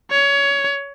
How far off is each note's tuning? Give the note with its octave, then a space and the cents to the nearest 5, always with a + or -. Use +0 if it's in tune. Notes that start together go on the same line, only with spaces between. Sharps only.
C#5 +20